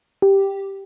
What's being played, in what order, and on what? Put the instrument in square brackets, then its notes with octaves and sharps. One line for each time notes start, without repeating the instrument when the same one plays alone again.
[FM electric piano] G4